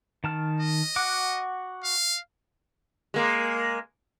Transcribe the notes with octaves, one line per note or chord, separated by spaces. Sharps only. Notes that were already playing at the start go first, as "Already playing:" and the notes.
D#3 A5 F6
D#5
F#4 F#5 D6
F5
G#3 A#3